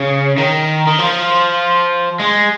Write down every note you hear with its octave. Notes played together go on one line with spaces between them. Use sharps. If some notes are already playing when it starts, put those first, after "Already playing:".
Already playing: C#3
D#3
D#3
F3
G#3